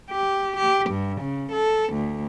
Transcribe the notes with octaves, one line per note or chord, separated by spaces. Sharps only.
G4
G4
G2
C#3
A4
D2